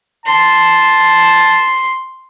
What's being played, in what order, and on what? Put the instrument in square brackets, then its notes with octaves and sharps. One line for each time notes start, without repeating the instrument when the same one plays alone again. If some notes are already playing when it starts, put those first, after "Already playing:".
[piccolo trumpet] A5 [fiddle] C6